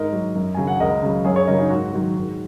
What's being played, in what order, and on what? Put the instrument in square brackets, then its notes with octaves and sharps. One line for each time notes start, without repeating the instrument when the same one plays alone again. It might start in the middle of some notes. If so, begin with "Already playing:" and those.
Already playing: [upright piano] G#2 A#4 D#5
F#3
F#2
C#3 F#3 G#5
F#5
C#2 A#4 D#5
C#3 F#3
F#2 G#4 C#5
G#4 C#5
C#3 F#3 A#4 D#5
D#4 G#4
G#2 F#4
D#3 F#3
G#2